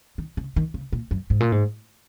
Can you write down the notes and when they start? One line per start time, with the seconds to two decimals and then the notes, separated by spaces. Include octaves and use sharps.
0.18 D#3
0.37 C#3
0.56 D#3
0.74 C#3
0.92 A#2
1.11 F#2
1.30 G#2
1.40 A#2
1.52 G#2